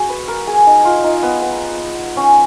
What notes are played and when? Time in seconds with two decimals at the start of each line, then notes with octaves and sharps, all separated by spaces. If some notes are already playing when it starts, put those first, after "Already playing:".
Already playing: F#4 G#4
0.09 B4
0.28 A#4
0.47 G#4
0.67 D#4
0.85 F4
1.04 D#4
1.23 B3
1.42 B3
2.17 C#4